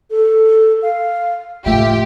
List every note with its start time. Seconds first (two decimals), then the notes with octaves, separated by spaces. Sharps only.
0.10 A4
0.82 F5
1.66 A2 A3 F4 G4 E5